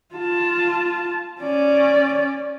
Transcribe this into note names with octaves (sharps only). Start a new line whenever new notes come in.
F4 A5
C#4 D5